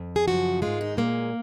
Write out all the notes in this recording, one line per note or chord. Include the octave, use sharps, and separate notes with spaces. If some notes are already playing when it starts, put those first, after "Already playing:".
Already playing: F2
G#4
F#2 C#3 F3 F#4
G#2 D#3 G#3 F4
D#4
A#2 G#3 A#3